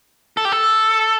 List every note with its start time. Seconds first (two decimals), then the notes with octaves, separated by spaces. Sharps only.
0.37 A4
0.45 G4
0.52 A4